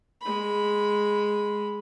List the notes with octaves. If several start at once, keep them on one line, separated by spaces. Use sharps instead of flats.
G#3 B5